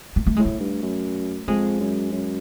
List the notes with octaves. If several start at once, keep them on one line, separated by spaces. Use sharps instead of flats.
A#3
A3
A2 G#3
A3
G2
F#2
F2 G#3
F#2
F#2